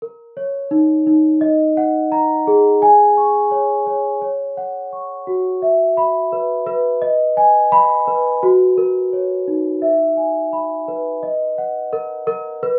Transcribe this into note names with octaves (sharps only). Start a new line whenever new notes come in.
A#4
C#5
D#4
D#4
D#5
F#5
A#5
G#4
G#5
C#6
C#5
C#5
C#5
F#5
C#6
F#4
E5
B5
B4
B4
D#5
G#5
B5
B4
F#4
A#4
C#5
D#4
E5
G#5
B5
B4
D#5
F#5
A#4
A#4
B4